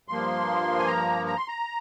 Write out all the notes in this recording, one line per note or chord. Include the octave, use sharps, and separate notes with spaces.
G2 F3 A#3 C6
G#5
A#5
A#5
C6
A#5